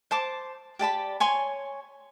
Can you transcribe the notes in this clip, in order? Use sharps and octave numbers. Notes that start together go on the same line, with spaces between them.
C5 A5 D6
G4 D5 A5 B5
C#5 G#5 C6 C#6